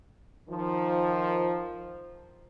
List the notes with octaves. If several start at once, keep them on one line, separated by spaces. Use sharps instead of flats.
D#3 F3